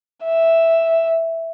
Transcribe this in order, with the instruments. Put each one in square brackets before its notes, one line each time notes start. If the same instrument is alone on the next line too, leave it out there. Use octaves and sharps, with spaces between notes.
[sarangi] E5